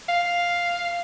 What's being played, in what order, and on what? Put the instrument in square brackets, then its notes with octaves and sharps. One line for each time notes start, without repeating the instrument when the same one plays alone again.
[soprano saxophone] F5